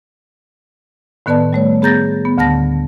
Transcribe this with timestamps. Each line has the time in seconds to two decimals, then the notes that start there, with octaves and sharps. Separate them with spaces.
1.26 A2 D#3 B3 B4 D5 A5
1.53 G3 A3 C#5
1.82 B3 G#4 A#5 G6 A6 A#6
2.25 B3
2.38 D2 D3 B3 A5 A#6